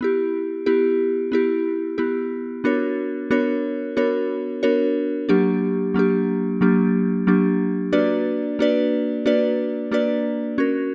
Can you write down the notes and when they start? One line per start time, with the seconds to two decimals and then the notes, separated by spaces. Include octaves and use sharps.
0.01 B3 E4 G4
0.66 B3 E4 G4
1.32 B3 E4 G4
1.98 B3 E4 G4
2.64 B3 D4 F#4 A#4 C#5
3.31 B3 D4 F#4 A#4 C#5
3.97 B3 D4 F#4 A#4 C#5
4.63 B3 D4 F#4 A#4 C#5
5.29 F#3 A#3 D4 G4
5.94 F#3 A#3 D4 G4
6.61 F#3 A#3 D4 G4
7.27 F#3 A#3 D4 G4
7.93 A#3 D4 F#4 B4 D5
8.59 A#3 D4 F#4 B4 D5
9.26 A#3 D4 F#4 B4 D5
9.91 A#3 D4 F#4 B4 D5
10.58 C#4 F#4 A#4